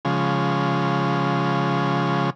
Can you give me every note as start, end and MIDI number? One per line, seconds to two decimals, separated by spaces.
0.05 2.30 49
0.05 2.30 53
0.05 2.30 56